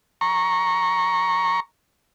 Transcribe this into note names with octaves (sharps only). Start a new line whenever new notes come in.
A#5 C#6